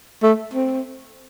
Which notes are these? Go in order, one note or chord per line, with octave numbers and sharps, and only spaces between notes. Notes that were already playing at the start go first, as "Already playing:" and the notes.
A3
C4